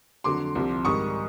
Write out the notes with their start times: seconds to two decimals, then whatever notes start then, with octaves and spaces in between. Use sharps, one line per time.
0.24 F2 D3 F#3 C6 D6
0.55 C2 C3 F3
0.85 G#2 D#3 G3 C#6 D#6